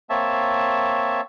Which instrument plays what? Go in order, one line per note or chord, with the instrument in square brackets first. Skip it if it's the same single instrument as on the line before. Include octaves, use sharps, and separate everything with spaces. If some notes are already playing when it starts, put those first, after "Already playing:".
[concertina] A#3 C4 C#5 E5 A5